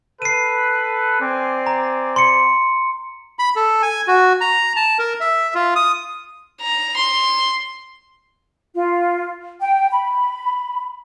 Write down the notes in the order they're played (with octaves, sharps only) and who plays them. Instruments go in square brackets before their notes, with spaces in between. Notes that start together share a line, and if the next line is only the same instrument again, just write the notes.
[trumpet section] A4 B4 [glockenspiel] C7 D#7
[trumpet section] C4 D5 G#5
[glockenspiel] A#5
C6 C#7
[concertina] B5
A4
G#5
F#4
A#5
A5
A#4
E5
F4
D#6
[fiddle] A#5
C6
[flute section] F4
G5
B5